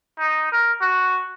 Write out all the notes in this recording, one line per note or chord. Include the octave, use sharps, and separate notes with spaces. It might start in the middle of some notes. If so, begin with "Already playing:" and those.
D#4
A#4
F#4